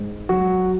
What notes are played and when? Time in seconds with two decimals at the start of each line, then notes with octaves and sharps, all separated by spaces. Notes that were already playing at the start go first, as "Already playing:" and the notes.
Already playing: G#2
0.29 F#3 F#4